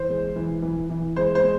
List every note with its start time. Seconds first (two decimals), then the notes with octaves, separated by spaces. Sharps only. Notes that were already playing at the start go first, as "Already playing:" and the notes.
Already playing: E3 C5
0.09 G#3
0.36 E3
0.62 E3
0.90 E3
1.16 G#3 C5
1.35 C5
1.43 G#3